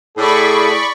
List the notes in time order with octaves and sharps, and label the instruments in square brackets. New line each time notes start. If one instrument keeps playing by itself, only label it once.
[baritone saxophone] A2 [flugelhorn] G#4 [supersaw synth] D5 B5 C#6